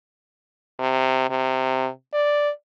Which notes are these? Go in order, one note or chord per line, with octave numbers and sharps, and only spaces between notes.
C3
C3
D5